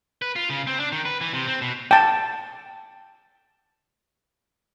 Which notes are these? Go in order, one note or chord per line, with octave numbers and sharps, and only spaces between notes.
B4
F4
C#3
C4
D4
D#3
B4
E3
C3
C4
B2
G5 A5